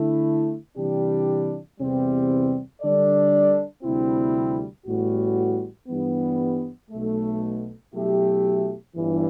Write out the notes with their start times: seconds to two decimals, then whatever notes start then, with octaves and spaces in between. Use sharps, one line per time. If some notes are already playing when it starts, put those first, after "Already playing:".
Already playing: D3 A3 E4
0.76 C3 E3 G3 D4 G4
1.78 E2 C3 E3 G3 C4
2.81 D3 G3 D4 A4 D5
3.83 D2 C3 G3 C4 E4
4.86 A1 A2 G3 B3 F#4
5.88 G2 E3 G3 B3
6.91 B1 B2 A3
7.93 B2 F#3 A3 E4 G4
8.95 G1 G2 E3